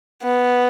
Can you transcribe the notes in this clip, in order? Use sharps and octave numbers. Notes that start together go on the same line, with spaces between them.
B3